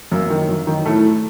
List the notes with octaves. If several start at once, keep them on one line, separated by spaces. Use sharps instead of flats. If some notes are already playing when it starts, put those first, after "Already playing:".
F#2 A#3
D#3
F#2
D#3
A2 A3